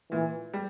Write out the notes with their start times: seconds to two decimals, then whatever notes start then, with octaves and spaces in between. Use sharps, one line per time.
0.12 A#2 E3
0.54 G3